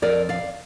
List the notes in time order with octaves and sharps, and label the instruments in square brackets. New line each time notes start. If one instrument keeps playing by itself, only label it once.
[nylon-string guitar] F2 A#4 D5
D5 F5